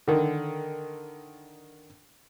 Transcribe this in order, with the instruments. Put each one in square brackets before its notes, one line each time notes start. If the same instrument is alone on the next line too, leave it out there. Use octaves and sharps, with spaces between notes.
[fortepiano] D3 D#3